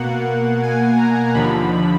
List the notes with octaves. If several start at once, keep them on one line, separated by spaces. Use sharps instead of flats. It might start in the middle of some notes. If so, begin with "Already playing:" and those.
Already playing: B2 A#3 F#5
G#5
A#5
D#2 D3 F3 B5